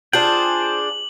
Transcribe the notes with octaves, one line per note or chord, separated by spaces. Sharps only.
D4 F4 G#4 C5 G5 F#7